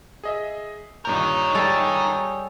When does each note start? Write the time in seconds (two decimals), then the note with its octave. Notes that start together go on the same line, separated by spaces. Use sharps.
0.24 G#4 D#5 E5
1.05 G2 A#2 D#4 A#4 C#5 D#6 G6
1.55 G3 G#4 A4